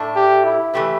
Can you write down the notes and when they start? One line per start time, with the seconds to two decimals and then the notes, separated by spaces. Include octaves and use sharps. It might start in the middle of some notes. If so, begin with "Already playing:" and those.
Already playing: A2 A3 D4
0.16 G4
0.44 E4
0.74 E3 A3 G4 B4